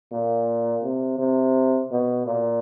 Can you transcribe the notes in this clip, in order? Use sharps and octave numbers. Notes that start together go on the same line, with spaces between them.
A#2
C3
C3
B2
A#2